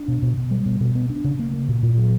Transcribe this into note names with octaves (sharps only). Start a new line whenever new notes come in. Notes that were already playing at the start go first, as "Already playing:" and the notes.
Already playing: D4
B2
B2
B2
G3
B2
B2
B3
D4
C#3
A#3
A#3
A#2
A#2
F#3